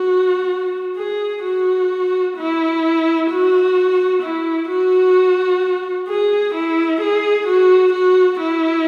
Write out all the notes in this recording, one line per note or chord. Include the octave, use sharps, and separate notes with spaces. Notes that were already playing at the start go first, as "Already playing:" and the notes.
Already playing: F#4
G#4
F#4
E4
F#4
E4
F#4
G#4
E4
G#4
F#4
F#4
E4